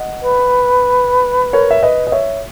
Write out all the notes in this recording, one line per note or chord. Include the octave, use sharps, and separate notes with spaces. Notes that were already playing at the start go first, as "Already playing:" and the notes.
Already playing: D#5 F#5
B4
A#4 C#5
E5
B4 D#5
D#5
C#5 E5